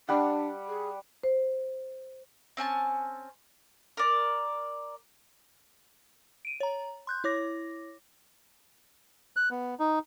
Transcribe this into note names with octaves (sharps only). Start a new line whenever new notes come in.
G3 D4 F#5
G#4
C5
C4 C#4 G#5 A5
A#4 D5
D7 D#7
C#5 A#5
C6 F#6 G6
E4 C#5 D6 A#6
F#6
B3
D#4